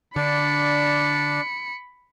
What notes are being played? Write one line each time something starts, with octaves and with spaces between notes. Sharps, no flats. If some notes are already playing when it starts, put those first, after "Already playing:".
D3 D4 D5 B5 C#7